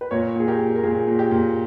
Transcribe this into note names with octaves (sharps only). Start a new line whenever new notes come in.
B4
A#2 A#4 C#5
A#2 G#4
G4 A#4
A#2
A#4
A#2 G#4
A#2
G4
A#2